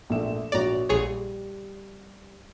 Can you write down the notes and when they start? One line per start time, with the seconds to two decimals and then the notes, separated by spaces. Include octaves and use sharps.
0.10 A#1 A3 E7
0.52 A#1 F#4 C#5 D5 A#5
0.89 A#1 G3 G#4 C#5